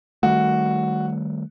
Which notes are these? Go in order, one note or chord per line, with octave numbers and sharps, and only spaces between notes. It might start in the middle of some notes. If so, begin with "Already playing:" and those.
D#3 G3 A3 F#4